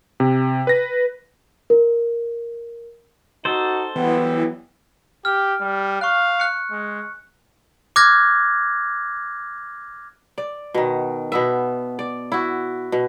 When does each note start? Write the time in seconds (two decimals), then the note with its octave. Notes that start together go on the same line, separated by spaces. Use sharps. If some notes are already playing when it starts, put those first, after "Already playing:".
0.20 C3
0.67 B4 A#6
1.70 A#4
3.45 D#4 F#4 A4 C5
3.96 E3 F#3 G3 B3
5.25 G4 F6
5.61 G3
6.01 F5 C#6 F#6
6.40 F#6 C#7
6.71 G#3
7.96 D6 F6 F#6 G#6 A#6
10.38 D5
10.74 B2 D#3
11.32 B2 B3 E5
11.99 D5
12.32 E4 F#4
12.92 B2